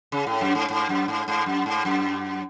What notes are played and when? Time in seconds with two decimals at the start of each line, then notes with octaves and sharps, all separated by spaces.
0.12 C#3
0.27 A2
0.41 F#2
0.55 G#2
0.70 G#2
0.89 F#2
1.08 G#2
1.28 G#2
1.46 F#2
1.66 G#2
1.85 F#2